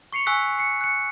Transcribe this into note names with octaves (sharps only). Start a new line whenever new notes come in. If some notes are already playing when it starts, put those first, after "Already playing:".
C#6 C7 C#7 F7
G#5 C#6 E6 F#6 B6
C7 C#7
F#6 C#7